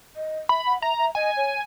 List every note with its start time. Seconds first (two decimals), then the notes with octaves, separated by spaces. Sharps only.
0.16 D#5
0.49 E5 B5
0.66 F#5
0.82 E5 A#5
0.99 E5
1.15 D#5 G#5
1.37 C#5